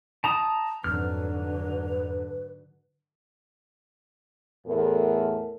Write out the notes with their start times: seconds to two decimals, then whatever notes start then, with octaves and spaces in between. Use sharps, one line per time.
0.24 G5 A5 A#5 D#6
0.84 F2 G#2 D3 F#3 B4 F6
4.66 E2 A2 A3 A4 A#4